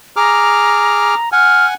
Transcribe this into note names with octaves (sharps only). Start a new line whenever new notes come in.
G#4 A#5 D6 F6
F#5 G#5 F6